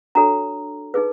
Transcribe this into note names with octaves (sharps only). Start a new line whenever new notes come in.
D4 F#4 A4 C#5 A#5
D#4 G#4 B4